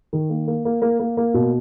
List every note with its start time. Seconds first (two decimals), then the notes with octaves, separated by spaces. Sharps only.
0.13 D#3
0.30 A#3
0.48 A#3
0.65 A#3
0.82 A#3
1.00 A#3
1.17 A#3
1.34 B2